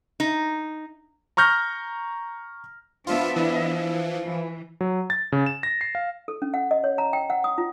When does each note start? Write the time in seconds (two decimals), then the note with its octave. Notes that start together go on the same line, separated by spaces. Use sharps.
0.20 D#4
1.37 A#5 C#6 F6 G6 A#6
3.07 F3 B3 D4 F4 E5
3.36 E3
4.25 E3
4.81 F#3
5.10 A6
5.32 C#3
5.46 E7
5.63 A#6
5.81 C7
5.95 F5
6.28 A4
6.42 C#4
6.54 F#5
6.71 D#5
6.84 C#5
6.98 A#5
7.13 G5
7.30 F#5
7.44 D#6
7.58 F4